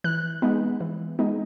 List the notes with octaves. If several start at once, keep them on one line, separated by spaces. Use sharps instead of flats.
E3 F#6
G#3 B3 D#4
E3
G#3 B3 D#4